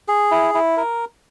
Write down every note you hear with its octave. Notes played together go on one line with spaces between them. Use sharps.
G#4
E4
E4
A#4